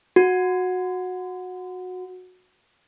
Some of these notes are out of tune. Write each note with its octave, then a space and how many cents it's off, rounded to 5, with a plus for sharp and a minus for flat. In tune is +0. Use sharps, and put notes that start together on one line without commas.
F#4 -15